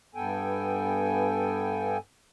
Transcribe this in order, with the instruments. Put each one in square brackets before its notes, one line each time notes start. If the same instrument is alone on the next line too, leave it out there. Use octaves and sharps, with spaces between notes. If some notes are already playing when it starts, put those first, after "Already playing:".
[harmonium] G2 B3 A4 G5 G#5